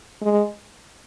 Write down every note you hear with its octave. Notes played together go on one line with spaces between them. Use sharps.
G#3